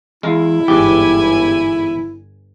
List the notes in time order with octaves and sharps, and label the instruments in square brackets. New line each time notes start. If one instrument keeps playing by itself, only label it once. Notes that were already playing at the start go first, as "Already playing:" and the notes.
[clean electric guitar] E2 [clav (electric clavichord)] G#3 F5 A#5 [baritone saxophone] E4
[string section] G1 G#5 [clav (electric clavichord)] E2 G#2 [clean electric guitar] G4